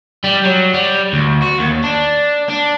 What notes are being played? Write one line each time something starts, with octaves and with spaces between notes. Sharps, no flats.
G3
F#3
G3
D2
F#4
D#2
D4
D4